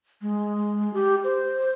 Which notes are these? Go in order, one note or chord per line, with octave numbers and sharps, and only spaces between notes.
G#3
G4
C5